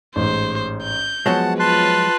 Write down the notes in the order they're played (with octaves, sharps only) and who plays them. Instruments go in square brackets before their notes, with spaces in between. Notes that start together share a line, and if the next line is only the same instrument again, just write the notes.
[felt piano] A1 G#2 [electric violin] C5
[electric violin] G6
[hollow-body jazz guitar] F3 F#3 G#3 [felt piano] B3 C#5 [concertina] F#5 A5
[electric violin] F4 B4 [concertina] A5 C6 F#6